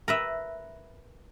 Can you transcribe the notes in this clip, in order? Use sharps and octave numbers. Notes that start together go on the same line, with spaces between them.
A#4 B4 E5